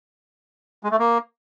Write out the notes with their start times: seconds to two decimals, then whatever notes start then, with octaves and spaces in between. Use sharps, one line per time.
0.84 G#3
0.91 A3
0.99 A#3